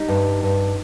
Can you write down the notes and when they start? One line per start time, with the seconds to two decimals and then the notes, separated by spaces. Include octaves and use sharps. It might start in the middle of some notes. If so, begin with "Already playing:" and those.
Already playing: G3 D#4
0.08 G2
0.43 G2